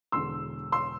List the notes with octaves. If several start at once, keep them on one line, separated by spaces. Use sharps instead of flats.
E1 E2 D3 C6 E6
C6 E6